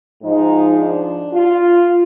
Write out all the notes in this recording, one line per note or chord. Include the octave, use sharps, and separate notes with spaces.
G#2 F3 G#3 D#4
D4
F4